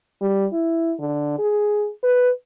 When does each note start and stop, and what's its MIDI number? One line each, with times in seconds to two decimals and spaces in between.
0.21 0.46 55
0.53 0.94 64
0.99 1.37 50
1.39 1.89 68
2.03 2.29 71